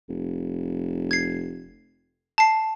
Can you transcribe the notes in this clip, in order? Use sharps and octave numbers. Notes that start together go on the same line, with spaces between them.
F1
G#6 C7
A5 C7